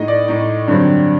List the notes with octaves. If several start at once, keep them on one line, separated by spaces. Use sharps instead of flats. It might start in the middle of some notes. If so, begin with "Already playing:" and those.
Already playing: A2 A3 D#4 D#5
D5
A2 A3 D#4
G2 D3 F#3 C4